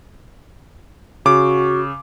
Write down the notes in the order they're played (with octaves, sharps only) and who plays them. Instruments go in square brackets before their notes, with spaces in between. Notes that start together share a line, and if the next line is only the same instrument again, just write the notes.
[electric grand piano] C#3 D6 [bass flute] F#4